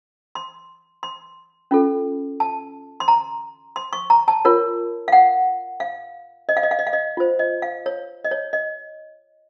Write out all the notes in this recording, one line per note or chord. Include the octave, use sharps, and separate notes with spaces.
C6
C6
C#4 F4 A4
A5
C6
A#5
C6
C#6
A#5
A5
F4 A#4 C#5
F5
F#5
F5
D#5
F5
D#5
F5
D#5
F5
D#5
F4 C5
D#5
F5
C#5
D#5
C#5
D#5